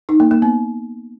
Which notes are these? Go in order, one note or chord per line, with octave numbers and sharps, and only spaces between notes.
D#4
A#3
A#3
B3